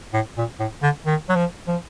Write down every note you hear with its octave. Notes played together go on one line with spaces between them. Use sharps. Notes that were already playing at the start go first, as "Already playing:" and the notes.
A2
A#2
A2
D3
D#3
F#3
F3
F3